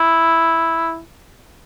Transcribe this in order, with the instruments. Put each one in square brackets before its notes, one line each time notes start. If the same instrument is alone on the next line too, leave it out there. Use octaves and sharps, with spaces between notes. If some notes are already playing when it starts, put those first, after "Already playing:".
Already playing: [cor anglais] E4